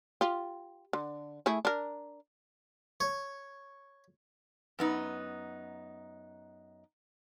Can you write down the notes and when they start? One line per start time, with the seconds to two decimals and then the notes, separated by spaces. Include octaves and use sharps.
0.21 F4 G4
0.93 D3
1.46 A3 E4 G#4
1.65 D4 A#4
3.00 C#5
4.79 F#2 B3 D#4